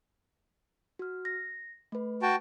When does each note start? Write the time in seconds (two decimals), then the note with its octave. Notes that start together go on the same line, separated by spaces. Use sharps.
0.99 F#4 F6
1.25 A#6
1.92 A3 B4
2.22 F#4 G5 A5